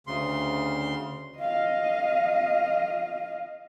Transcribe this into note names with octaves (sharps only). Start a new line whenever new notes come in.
D2 C#3 C6
D#5 F5